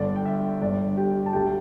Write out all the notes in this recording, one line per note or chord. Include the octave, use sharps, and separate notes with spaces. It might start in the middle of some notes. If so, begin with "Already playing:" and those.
Already playing: G1 G2 D3 D5
G5
E5
G1 G2 D3 D5
G4 G5
A5
D2 D3 G3 G4 G5